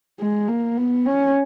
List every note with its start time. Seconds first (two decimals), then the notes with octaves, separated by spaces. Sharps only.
0.20 G#3
0.48 A#3
0.77 B3
1.06 C#4